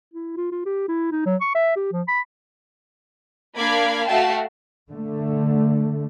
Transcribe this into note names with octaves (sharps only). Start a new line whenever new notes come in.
E4
F4
F4
G4
E4
D#4
F#3
C#6
E5
G4
F3
B5
A#3 D4 F5 B5 D6 G#6
A3 F#4 E5 F5 G5 A5
D3 A3